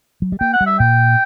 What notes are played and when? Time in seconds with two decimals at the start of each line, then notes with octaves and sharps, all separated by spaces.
0.22 F#3
0.32 G3
0.40 A#3 G5
0.53 F#5
0.61 G3
0.66 E5
0.79 A#2 G5